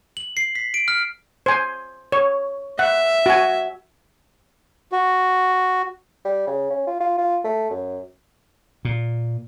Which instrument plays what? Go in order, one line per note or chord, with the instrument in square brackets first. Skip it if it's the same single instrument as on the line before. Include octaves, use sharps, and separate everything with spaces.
[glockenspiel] F#7
C7
B6
D7
F6
[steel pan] C5 G#5
C#5
[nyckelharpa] E5 [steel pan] F#5
[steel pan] F#4 G#5
[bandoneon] F#4
[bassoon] G3
C#3
C#4
F4
F4
F4
A3
F#2
[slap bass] A#2